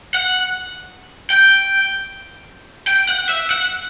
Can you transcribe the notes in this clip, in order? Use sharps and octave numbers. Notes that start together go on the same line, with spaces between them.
F#5
G5
G5
F#5
E5
F#5